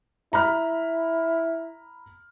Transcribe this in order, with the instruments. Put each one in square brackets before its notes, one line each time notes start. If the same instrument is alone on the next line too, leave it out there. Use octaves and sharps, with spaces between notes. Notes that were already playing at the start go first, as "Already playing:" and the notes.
[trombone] E4 [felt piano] A#5 B5 F6